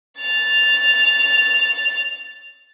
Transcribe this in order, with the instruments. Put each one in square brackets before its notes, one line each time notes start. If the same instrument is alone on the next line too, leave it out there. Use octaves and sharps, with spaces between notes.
[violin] A6 F7